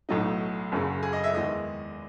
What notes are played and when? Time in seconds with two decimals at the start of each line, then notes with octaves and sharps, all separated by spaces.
0.09 B1 A2 F#3 A3 D#4
0.72 F#1 F#2 C#3
1.03 G#4
1.13 D#5
1.24 E5
1.34 E2 D#3 G#3 D#5